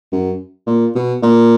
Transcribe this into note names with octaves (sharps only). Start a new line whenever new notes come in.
F#2
A#2
B2
A#2